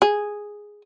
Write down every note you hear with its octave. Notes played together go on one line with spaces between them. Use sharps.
G#4